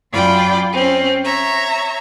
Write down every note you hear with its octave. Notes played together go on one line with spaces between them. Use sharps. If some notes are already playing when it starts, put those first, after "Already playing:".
F#2 F4 D5 G5 B5
C4 C#4
C#5 E5 A#5